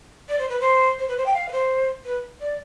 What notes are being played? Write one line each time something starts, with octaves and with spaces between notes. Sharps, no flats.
D5
C5
B4
C5
C5
B4
C5
G5
F5
B4
C5
B4
D5